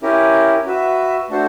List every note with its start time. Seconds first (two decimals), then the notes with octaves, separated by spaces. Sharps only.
0.02 C#4 E4 G4 A#4
0.66 F#4 B4 E5
1.29 A3 D4 F#4 A4 C5